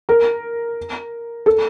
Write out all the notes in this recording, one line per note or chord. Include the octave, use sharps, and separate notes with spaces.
A#4
A4